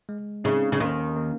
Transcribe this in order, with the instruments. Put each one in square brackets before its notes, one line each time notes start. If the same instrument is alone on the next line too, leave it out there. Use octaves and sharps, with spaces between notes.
[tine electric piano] G#3
[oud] C#3 [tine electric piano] C4 D#4
[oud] C#3
[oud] D#2 D#3 [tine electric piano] A#3 C#4
[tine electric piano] A#3